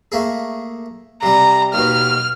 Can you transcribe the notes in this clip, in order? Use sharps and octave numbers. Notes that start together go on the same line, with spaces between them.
A3 A#3 G#4
C3 G3 A#5
D#2 B2 F6